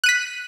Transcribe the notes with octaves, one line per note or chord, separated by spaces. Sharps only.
F#6 B6 D#7